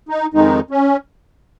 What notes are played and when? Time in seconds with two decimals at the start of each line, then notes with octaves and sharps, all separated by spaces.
0.09 D#4
0.34 F2 D#3 G#3 D#4
0.71 C#4